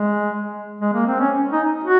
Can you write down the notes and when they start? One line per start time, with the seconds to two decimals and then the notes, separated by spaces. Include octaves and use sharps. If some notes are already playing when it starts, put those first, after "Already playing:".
Already playing: G#3
0.81 G#3
0.93 A#3
1.07 C4
1.20 C#4
1.52 D#4
1.84 F#4